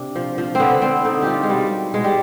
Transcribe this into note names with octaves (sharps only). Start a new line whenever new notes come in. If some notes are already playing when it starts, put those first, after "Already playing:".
Already playing: C3 D4
F3
F3
D3 B3 C4
D3 C4
D3 D#4
G3 F4 G4
G#3
B2 G3
G3
B2 G#3
G3